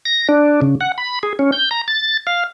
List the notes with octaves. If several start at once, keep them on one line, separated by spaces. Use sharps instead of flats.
A#6
D4
C#3
F#5
B5
G#4
C#4
G6
A#5
A6
F5